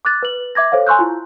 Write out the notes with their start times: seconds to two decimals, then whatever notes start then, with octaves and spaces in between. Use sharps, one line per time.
0.05 D6 F#6 A6
0.23 B4 F#7
0.55 E5 D6 G#6 A#6
0.72 A4 C5 C#5 F5
0.87 G#5 C6 C#6 E6 F#6 G6
0.99 E4 F4